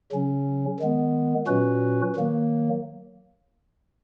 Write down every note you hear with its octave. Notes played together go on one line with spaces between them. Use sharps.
C#3 F#3 C#4
D#3 G#3 B3
A#2 F#3 C#4 F#4 B4
D#3 F#3 A#3